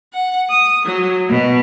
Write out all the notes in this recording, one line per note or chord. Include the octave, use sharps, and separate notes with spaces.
F#5
D#6
F#3
B2